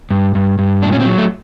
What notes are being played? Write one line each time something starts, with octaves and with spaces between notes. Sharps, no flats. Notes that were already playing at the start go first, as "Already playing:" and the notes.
G2
G2
G2
A#2 D4
C#4
C4
F#3
A3